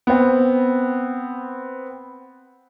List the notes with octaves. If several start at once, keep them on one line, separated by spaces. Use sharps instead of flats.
B3 C4